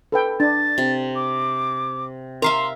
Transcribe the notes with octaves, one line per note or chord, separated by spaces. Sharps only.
A4 B4 G5
D4 A6
C3
D6
A#4 E5 F5 A#5 C6